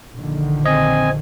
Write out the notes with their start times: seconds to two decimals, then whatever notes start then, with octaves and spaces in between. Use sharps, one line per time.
0.15 A#1 D3 D#3
0.66 C4 D#5 G#5